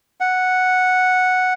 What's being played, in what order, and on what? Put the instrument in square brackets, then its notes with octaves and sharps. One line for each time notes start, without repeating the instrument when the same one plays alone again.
[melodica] F#5